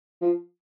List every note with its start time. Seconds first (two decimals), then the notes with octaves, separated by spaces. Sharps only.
0.21 F3